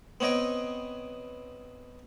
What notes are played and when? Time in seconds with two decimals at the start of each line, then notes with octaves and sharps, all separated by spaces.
0.20 B3 C4 C#5 D#5 G5